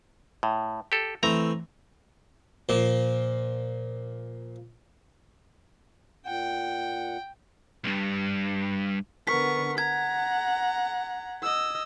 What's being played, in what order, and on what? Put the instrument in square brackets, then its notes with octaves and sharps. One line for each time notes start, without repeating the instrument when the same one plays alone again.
[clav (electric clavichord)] A2
G4 A4
[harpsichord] E3 A3 C4 [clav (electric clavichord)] A#5
[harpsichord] A#2 F3
[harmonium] A#2 F#5 [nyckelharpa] G5
[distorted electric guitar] B1 G2
[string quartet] D3 B3 [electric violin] A#4 C#6 [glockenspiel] B6
[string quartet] F#5 [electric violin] A#5 [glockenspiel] G#6
[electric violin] D#5 E6